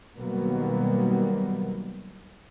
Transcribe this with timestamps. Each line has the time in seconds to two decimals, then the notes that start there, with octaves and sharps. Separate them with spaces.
0.18 B2 D#3 F#3 G3 A#3 B3